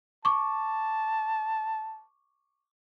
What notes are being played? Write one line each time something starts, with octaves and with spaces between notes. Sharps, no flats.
A5 C#6 D6